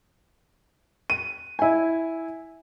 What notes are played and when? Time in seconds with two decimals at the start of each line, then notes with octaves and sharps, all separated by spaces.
1.10 D#7
1.59 E4 G#5